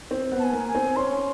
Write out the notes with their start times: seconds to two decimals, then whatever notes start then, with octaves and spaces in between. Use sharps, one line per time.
0.11 C4
0.32 B3
0.39 A5
0.44 G#5
0.53 A#3
0.68 G#5
0.75 C4
0.96 C#4 C6